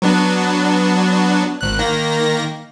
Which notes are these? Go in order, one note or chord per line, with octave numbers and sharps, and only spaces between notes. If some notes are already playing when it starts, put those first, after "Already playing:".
F#3 B3 D4
G#1 F#6
D#3 A#3 A#6